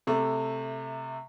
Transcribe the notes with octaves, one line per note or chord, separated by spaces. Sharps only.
C3 A3